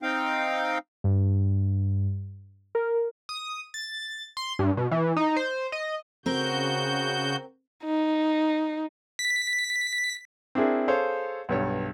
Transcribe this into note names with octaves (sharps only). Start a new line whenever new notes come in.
C4 D#4 F5 G5
G2
A#4
D#6
A6
C6
G2
B2
E3
D#4
C5
D#5
C#3 C4 F#4 A#4 G6
D#4
B6
C4 D4 E4 G#4 A#4
G#4 A4 C5 C#5 F5
B1 G2 C#5